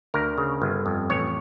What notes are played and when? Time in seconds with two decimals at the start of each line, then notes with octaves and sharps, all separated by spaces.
0.14 D2 A#4
0.38 C#3
0.62 G1
0.86 F2
1.10 A1 C#5